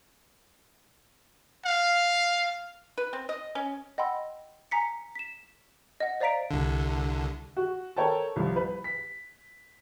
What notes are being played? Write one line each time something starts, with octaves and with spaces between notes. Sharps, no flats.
F5
B4
C4
D#5
C#4
D#5 F#5 G5 B5 C6 E6
G#5 A#5 B6 C#7
B6 E7
D#5 F#5
C5 D5 F5 A#5 B6 D7
C2 D3
F#4
A4 A#4 C#5 G5 A5
C2 F3
B4
B6